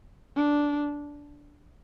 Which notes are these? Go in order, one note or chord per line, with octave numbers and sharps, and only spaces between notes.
D4